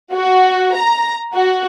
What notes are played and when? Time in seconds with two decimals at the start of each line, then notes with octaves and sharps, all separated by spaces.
0.13 F#4
0.75 A#5
1.33 F#4